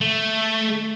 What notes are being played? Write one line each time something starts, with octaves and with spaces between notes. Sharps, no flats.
A3